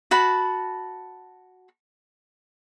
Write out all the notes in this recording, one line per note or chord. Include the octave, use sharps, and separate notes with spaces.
F#4 A5 B5